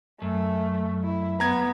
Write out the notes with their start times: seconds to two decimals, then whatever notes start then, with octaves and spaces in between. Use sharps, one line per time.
0.22 F#2 A3
1.04 E4
1.40 B3 A#5 G#6